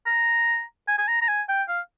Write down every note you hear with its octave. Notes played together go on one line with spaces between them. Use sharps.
A#5
G#5
G#5
A#5
A#5
G#5
G5
F5